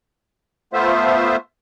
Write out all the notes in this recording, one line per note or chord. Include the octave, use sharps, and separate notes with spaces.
A3 B3 F4 C5 E5